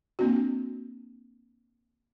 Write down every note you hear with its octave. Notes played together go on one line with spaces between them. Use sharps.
A#3 C4 D4 F#4